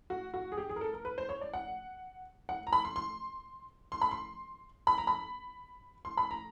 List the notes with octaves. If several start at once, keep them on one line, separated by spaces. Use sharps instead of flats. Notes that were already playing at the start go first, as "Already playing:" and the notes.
F#4
F#4
G#4
G4
G#4
A#4
A4
A#4
B4
C5
C#5
D5
F#5
F#5
A#5
B5
C6
C6
C6
B5
C6
B5
A#5
B5
C6
B5
A#5